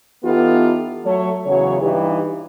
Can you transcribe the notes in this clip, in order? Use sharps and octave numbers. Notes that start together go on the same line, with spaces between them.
E3 B3 D#4 F4 G4 A4
F#3 A3 C#5
E2 C#3 F#3 C#5
G2 E3 D#4 G4